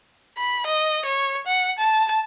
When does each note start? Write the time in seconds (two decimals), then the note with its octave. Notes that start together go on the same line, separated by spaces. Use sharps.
0.38 B5
0.67 D#5
1.06 C#5
1.47 F#5
1.79 A5